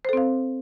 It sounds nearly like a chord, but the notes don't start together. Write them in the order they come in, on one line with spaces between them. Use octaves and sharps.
C5 A4 C4 F5